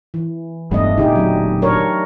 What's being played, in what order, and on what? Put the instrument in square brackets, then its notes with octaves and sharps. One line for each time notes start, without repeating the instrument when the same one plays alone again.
[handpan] E3
[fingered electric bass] E1 G2 B3 [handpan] A3 D4 D#5
[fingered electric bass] E1 A#2 D3 [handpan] D#4 G4 G#4
[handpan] F#3 D4
D4 A#4 C#5